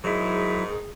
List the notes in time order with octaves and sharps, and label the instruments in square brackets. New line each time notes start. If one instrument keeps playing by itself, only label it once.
[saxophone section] G#2 D#3 D#4 [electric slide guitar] F#3 E4 [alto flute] G#4